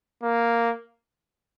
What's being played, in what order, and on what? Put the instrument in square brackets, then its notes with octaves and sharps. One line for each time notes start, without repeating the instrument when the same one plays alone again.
[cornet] A#3